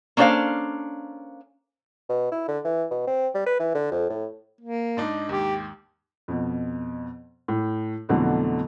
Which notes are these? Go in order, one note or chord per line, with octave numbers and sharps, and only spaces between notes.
A#3 C#4 D4 A4 C5 F5
B2
E4
D3
E3
B2
C4
G3
B4
E3
D3
F2
A2
A#3
G#2 D4 D#4
D#2 G#2 G4
F2 B2
A2
F2 B2 D3 E3 F#3 A3